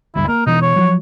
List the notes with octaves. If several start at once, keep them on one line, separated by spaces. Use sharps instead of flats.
F#1 D2 G2 E4
A#3 A#4
B2 E3 D#4
C#5
F3 F#3